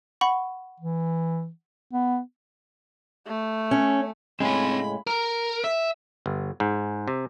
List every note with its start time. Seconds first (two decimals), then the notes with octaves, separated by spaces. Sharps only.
0.21 F#5 B5 C#6
0.80 E3
1.93 B3
3.27 A3
3.71 C#4
4.40 A2 C#3 G#3 C4 G#5 B5
5.07 A#4
5.64 E5
6.26 G1
6.60 G#2
7.08 C3